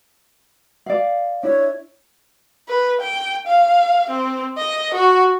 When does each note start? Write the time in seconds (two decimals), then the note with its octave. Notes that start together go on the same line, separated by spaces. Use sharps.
0.86 D5 F5
1.43 D4 E4 C#5
2.68 B4
3.01 G5
3.47 F5
4.10 C4
4.58 D#5
4.94 F#4